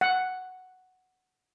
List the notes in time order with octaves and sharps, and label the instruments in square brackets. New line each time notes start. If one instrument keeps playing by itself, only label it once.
[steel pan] F#5